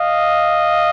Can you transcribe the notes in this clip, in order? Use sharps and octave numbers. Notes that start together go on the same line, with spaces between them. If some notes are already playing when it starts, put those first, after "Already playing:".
Already playing: D#5 F5